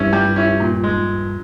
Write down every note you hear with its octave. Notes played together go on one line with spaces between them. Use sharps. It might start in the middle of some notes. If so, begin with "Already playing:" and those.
Already playing: G2 C#4 E4
G3
C#4 E4
A#2
G#3